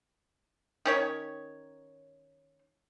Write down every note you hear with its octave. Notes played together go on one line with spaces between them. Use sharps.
D#3 C#4 C#5